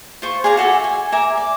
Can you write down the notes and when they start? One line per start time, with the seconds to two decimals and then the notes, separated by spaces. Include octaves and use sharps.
0.22 F4 C5 C#6
0.44 G#4 D5 F5 A#5
0.57 F#4 A4 D5 E5
0.84 G#5
1.12 A#4 E5 G#5 D6
1.37 D5